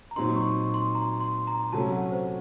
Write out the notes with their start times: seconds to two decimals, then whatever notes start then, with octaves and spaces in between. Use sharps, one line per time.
0.11 A#5
0.16 A#2 F#3 C4 D#4 C6
0.36 C#6
0.74 C6
0.95 A#5
1.21 C6
1.47 A#5
1.72 C3 F#3 A3 C#4 A5
1.92 F#5
2.11 C5